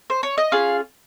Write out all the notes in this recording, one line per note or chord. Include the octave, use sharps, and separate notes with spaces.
C5
C#5
D#5
C#4 F4 G#4 F5